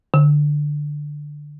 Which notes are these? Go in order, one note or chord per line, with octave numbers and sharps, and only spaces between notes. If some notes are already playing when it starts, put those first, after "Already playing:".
D3